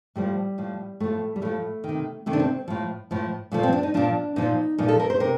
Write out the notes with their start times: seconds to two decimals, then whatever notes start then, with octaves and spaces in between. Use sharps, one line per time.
0.16 A2 F3 G3
0.58 A2 F3
1.00 A2 F3 A3
1.36 G3
1.42 A2 F3 A3
1.84 C3 D#3
2.26 C3 D#3 A3
2.33 D4
2.40 C4
2.68 A2 F3
3.11 A2 F3
3.52 A#2 F3 A3
3.63 C4
3.73 D4
3.83 D#4
3.94 A#2 F3 D4
4.36 A#2 F3 D#4
4.78 A#2 F3 D#4
4.88 A4
5.00 A#4
5.10 C5
5.20 C3 A#4